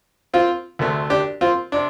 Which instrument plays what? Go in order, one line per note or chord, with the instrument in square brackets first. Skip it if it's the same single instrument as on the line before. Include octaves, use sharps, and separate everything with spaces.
[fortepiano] C4 F4
D2 C3 A3
D4 G4
C4 F4
C3 D4